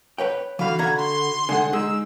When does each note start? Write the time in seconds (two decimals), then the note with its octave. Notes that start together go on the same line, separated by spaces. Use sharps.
0.18 B4 C#5 G5
0.59 D3 E3 F#4 F5 B5
0.79 D3 F#5 A#5 G#6
0.98 C6
1.49 D3 G#3 F#5 G#5
1.73 G#3 D#4 G#4 E6